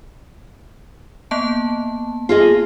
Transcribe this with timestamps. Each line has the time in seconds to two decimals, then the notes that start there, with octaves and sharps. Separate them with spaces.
1.31 A#3 B3 A5
2.29 F4 G#4 D#5